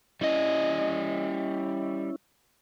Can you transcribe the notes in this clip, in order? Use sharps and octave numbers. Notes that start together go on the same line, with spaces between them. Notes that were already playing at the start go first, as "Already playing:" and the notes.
G3 C#4 E4 D#5